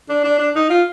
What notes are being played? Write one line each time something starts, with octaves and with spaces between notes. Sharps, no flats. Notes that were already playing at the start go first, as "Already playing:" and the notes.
D4
D4
D4
D#4
F4